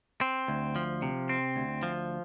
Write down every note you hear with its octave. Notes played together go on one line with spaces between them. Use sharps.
C4
D2
F3
C3
C4
D2
F3